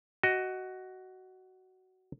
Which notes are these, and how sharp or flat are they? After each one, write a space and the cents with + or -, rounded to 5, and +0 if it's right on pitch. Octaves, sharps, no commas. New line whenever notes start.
F#4 +15 D#5 +0